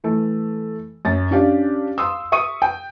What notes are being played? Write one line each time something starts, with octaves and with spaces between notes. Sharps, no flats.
E3 A3
F#2 A6
C#4 D4 G4 F5
F5 C6 D#6 E6
E5 C#6 D#6 D#7
G5